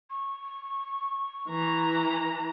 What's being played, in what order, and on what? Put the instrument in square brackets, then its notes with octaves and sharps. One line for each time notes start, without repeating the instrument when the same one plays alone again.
[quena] C#6
[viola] E3 A#5